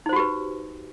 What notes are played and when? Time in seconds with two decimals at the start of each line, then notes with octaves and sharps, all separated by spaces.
0.06 D#4
0.09 C5
0.13 F#4
0.16 G4
0.19 B4